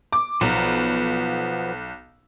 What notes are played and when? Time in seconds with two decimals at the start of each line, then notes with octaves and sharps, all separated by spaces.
0.13 D6
0.41 B1 F3 B3 A#5